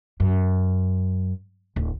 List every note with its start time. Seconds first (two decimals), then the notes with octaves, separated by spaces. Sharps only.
0.20 F#2
1.76 D1